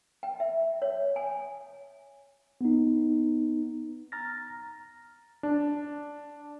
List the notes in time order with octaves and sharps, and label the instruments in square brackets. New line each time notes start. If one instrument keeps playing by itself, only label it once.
[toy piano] G5
E5
C#5
G#5
[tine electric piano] B3 D#4
A#5 F6 A6 A#6
[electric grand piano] D4